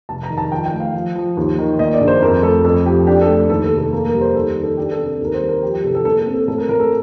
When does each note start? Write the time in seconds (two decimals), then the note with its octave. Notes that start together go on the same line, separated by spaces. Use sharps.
0.09 F1 A5
0.23 A#5
0.30 D#3
0.38 A5
0.52 F3 G5
0.66 G5
0.73 A3
0.80 F5
0.94 F3
1.15 F3
1.37 D#2
1.58 D#3
1.79 A#2 D#5
1.93 D5
2.00 A#1
2.08 C5
2.22 F2 A#4
2.43 A3 A4
2.65 F2 A4
2.86 F3 G4
3.07 D4 G4
3.21 A4
3.28 A3
3.50 D#2 A4
3.64 A4
3.72 F1
3.78 A4
3.92 A#3 A4
4.07 A#4
4.14 G3
4.21 C5
4.35 D#2 A4
4.56 D#3
4.63 A4
4.77 D4 G4
4.92 A4
4.99 C3
5.06 A4
5.20 D#2 A#4
5.34 C5
5.42 G3
5.49 A#4
5.63 F3 G4
5.73 G4
5.84 C2 A4
5.95 A4
6.05 A#2 A4
6.19 A4
6.26 C4
6.34 A4
6.48 A2 A4
6.58 A#4
6.69 A2 A#4
6.80 A4